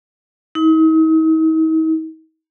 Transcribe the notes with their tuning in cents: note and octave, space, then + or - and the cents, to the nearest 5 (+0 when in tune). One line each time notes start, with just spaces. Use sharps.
D#4 +45